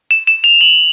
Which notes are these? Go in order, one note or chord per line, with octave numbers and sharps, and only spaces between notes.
E7
E7
F7
F#7